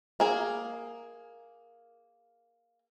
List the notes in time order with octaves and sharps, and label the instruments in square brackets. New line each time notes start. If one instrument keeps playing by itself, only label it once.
[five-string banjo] A#3 G#4